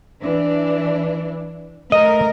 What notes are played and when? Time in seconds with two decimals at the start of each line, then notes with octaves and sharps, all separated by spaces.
0.22 E3 D4
1.92 A3 A#4 D#5